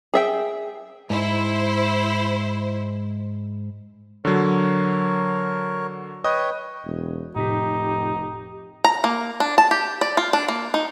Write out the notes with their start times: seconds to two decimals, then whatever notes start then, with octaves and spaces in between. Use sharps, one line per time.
0.14 G#4 E5 G5
1.10 G#2 E4 C5
4.25 D3 F#3 A#4 C#5
6.24 B4 C#5 D#5 G5 D#6
6.85 E1
7.36 F1 A2 C3 D#4 G4 B6
8.84 A#5
9.04 A#3
9.40 D4
9.58 A5
9.71 G4
10.01 D5
10.17 F4
10.33 D4
10.48 A#3
10.74 D#4